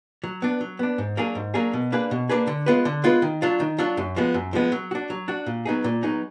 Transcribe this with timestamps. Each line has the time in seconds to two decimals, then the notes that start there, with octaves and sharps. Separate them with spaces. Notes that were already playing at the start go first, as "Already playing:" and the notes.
0.24 F#3
0.42 B3 D4
0.61 F#3
0.79 B3 D4
0.98 G#2
1.17 F#3 A#3 D4 G#4
1.35 G#2
1.54 F#3 A#3 D4 G#4
1.73 B2
1.92 A#3 D4 G#4 B4
2.11 B2
2.29 A#3 D4 G#4 B4
2.47 D3
2.66 G#3 B3 F4 B4
2.85 D3
3.04 G#3 B3 F4 B4
3.22 D#3
3.42 F#3 D4 F4
3.60 D#3
3.79 F#3 D4 F4
3.97 F#2
4.16 F3 G#3 B3
4.34 F#2
4.53 F3 G#3 B3
4.72 F#3
4.91 D4 F#4
5.10 F#3
5.28 D4 F#4
5.46 A#2
5.66 F#3 B3 D#4 G#4
5.84 A#2
6.03 F#3 B3 D#4 G#4